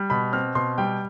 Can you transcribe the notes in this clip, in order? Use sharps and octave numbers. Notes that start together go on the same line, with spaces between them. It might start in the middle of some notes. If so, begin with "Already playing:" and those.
Already playing: G3
B2 B5
C4 F6
B2 C6
G3 G5